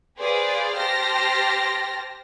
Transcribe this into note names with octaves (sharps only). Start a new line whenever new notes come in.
G#4 B4 C5 D5 F5
G4 C5 A5 F6 A#6